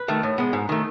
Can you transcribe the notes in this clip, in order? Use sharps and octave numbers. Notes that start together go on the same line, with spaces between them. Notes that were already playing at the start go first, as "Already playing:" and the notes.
Already playing: B4
D#3 A3
A2
G#3 B3
G#2
D#3 A3